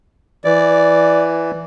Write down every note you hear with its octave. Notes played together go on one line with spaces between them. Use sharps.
E3 D5